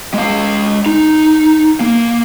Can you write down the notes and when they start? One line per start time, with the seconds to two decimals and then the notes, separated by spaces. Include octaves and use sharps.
0.14 G#3 F5
0.86 D#4
1.80 A#3